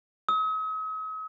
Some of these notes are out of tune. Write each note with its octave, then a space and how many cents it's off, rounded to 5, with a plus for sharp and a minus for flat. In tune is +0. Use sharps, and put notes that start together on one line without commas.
D#6 +45